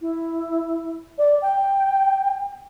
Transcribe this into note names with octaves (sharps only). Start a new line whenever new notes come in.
E4
D5
G5